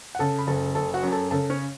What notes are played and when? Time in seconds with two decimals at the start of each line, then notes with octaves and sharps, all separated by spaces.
0.15 F#5
0.19 C#3 A4 A5
0.39 B5
0.47 F#1 A4 A5
0.75 F#1 A4 A5
0.94 F#4 F#5
1.03 F#2
1.12 A4 A5
1.31 C#3 A4 A5
1.50 C#4 C#5